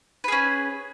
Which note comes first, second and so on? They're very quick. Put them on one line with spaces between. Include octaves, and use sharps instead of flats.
B4 G#4 C#4